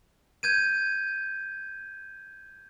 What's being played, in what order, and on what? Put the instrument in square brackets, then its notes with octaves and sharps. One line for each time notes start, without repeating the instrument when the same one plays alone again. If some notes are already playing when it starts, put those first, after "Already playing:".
[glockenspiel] G6 G#6 D#7